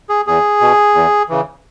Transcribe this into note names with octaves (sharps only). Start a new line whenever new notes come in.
G#4
E2 G#4
B2
E2
C#3 E3